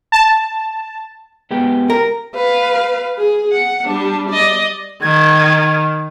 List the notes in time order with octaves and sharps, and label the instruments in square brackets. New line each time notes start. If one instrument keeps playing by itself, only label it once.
[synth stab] A5
[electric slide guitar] G#3 B3 G4
[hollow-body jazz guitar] A#4
[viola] B4 F5
G#4
F#5
G3 D4
D5 D#5
[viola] D#3 [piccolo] G#6